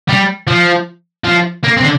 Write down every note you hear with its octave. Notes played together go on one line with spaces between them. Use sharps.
G3
F3
F3
A#3
C4
D3